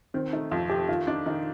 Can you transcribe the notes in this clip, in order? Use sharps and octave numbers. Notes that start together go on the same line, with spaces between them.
D#3 C4
A3 D#4
F2 F4
A3 G4
D#3 F4
D4 D#4
D#3 D#4